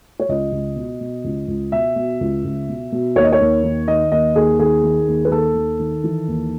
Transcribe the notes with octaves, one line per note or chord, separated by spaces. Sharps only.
C#5
C#2 D#5
C#2
B2
B2
C#2
C#2
B2 E5
B2
C#2
C#2
B2
B2
D#2 C#5
D#5
C#5
D#2
D#3
D#3 D#5
D#2 D#5
D#2 G#4
D#3 G#4
D#3
D#2
B4
D#2 A4
D#3
D#3
E3
D#2